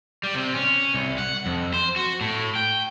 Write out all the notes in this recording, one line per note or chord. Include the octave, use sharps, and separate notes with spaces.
G3
C3
C#4
C2
F#5
F2
C5
F#4
A2
G5